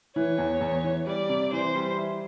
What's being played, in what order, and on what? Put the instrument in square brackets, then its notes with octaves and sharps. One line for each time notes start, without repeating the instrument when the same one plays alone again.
[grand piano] E3 [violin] C#5
[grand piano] E2
E2
E3
[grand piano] G3 [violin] D5
[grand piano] C3
[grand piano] E3 [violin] C5
[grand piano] G3
E4